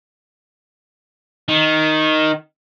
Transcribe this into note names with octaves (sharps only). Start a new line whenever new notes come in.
D#3